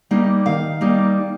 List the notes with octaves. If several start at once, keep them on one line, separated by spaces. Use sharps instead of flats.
G3 A#3 D#4
D#3 F5
G3 A#3 D#4